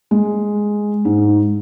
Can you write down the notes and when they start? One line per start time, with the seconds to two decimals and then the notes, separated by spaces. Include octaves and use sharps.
0.11 G#3
1.05 G#2